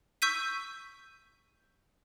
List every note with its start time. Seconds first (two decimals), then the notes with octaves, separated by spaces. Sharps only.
0.22 C#6 E6 G6 B6 D#7